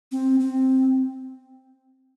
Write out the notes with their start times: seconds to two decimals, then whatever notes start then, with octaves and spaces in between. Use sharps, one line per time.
0.12 C4
0.40 C4